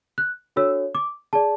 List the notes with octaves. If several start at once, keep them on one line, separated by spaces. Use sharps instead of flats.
F#6
D4 F#4 A4 C#5 E6
D6
G#4 D5 A5